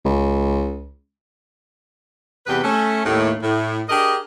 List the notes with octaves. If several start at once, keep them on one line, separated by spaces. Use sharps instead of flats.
C#2
E2 C3 G4 B4
A3 C#4
D#2 A2
A2
D4 G4 G#4 A#4 D#5